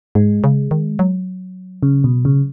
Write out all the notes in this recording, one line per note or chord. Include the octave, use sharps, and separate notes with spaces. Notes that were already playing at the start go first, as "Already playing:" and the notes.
G#2 G#3
C#3
D#3
F#3
C#3
B2
C#3